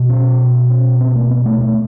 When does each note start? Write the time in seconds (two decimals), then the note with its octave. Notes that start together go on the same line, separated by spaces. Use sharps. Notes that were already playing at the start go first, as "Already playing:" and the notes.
Already playing: B2
0.10 C#4
0.70 C#4
1.01 C4
1.16 A#3
1.31 B3
1.46 A3
1.61 A3